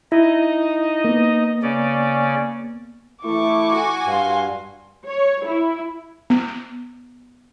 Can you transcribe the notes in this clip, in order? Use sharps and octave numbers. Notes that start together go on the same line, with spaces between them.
D#4 E4 D#5
A#3 B3
C#3 C#4 D5
E3 A3 E4 C#6 D6
F#4 G#5
G2 F5 C6
C#5
E4
B3